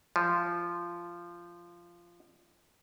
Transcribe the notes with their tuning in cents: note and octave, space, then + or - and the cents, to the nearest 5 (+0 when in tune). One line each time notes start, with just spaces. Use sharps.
F3 -15